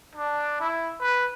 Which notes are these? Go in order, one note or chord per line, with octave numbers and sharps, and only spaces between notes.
D4
E4
B4